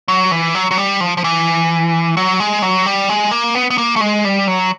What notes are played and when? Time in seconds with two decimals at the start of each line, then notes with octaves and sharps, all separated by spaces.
0.08 F#3
0.31 E3
0.55 F#3
0.71 F#3
0.78 G3
1.01 F3
1.17 F3
1.24 E3
2.17 F#3
2.40 G#3
2.62 F#3
2.86 G3
3.09 G#3
3.31 A#3
3.55 B3
3.70 B3
3.78 A#3
3.96 A3
4.01 G#3
4.25 G3
4.48 F#3